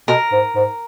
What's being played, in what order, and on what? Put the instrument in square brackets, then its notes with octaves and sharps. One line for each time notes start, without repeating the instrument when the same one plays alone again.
[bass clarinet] B2 [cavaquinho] A#4
[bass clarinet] G#2
G#2